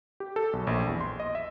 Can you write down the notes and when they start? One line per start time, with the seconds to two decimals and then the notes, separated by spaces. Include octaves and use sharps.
0.20 G4
0.36 A4
0.53 B1
0.67 A#1
0.88 E2
1.00 C6
1.20 D#5
1.35 E5